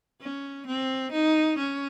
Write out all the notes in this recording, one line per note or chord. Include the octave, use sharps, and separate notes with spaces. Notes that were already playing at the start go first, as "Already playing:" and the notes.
C#4
C4
D#4
C#4